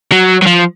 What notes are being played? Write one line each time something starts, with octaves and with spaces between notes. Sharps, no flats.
F#3
F#3
F3